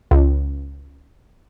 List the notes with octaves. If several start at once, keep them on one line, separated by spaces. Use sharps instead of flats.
C#2